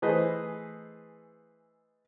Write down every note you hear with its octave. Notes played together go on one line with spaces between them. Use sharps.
E3 A3 G#4 B4 C5 D#5